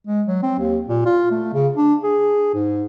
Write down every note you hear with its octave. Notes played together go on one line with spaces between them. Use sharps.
G#3
F#3
C4
D#2
A#2
F4
A3
C#3
D4
G#4
G#2